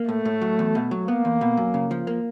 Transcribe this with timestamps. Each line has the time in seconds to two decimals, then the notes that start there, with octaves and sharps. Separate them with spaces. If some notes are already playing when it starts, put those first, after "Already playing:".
Already playing: A#3
0.09 A2 A3
0.25 A2
0.41 F#3
0.59 E2
0.75 B2
0.91 F#3
1.08 A#3 B3
1.25 E2
1.41 B2
1.57 F#2
1.74 C#3
1.91 F3
2.07 A#3